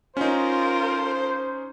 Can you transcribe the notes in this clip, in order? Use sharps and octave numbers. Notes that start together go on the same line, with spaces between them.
C#4 D#4 F4 A#4 C5